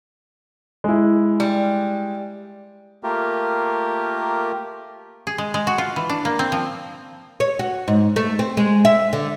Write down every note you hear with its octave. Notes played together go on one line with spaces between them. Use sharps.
G#3 E4
G3
A3 A#3 F4 G4 A#4
G#4
G#3
G#3
F#4
F4
E3
D4
A#3
C4
F3
C#5
F#4
G#2
A3
C4
G#3
E5
D3